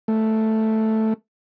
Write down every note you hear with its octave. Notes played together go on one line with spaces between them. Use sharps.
A3